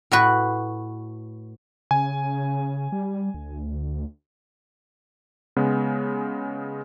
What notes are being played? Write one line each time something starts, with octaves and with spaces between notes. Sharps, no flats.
A2 F#4 B4
C#3 G#5
G3
D2
C#3 G#3 B3